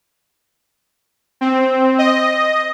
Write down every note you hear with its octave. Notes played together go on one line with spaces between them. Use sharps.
C4
D#5